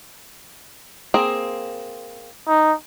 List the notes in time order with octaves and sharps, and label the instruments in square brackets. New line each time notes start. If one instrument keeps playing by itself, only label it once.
[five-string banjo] A#3 C4 G#4
[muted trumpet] D#4